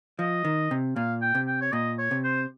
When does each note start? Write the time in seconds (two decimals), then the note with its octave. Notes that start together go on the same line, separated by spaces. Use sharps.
0.19 F3 D#5
0.45 D#3
0.71 C3
0.96 A#2 F5
1.22 G5
1.35 C3
1.47 G5
1.61 C#5
1.73 A#2 D#5
1.98 C#5
2.11 C3
2.24 C5